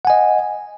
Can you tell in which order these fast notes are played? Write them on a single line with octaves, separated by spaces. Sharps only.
F#5 G#5 D#5